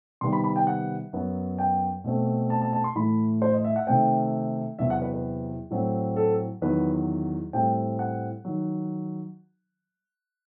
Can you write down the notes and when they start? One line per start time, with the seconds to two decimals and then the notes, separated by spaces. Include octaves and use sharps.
0.21 C3 D#3 G3 B3 C6
0.33 B5
0.44 B5
0.56 G5
0.67 F#5
1.13 F#2 F#3 B3
1.58 G5
2.04 B2 A3 C4
2.50 A5
2.62 A5
2.73 A5
2.84 C6
2.95 A2 E3 A3 B5
3.42 C5
3.53 D#5
3.64 E5
3.76 F#5
3.87 C3 D#3 A3 C4 G5
4.79 E2 C3 F#3 B3 E5
4.90 F#5
5.02 B4
5.13 B4
5.70 A2 F#3 C4
6.16 A4
6.62 E2 D#3 F#3 B4
7.53 A2 G3 C4 G5
7.99 F#5
8.45 D#3 F#3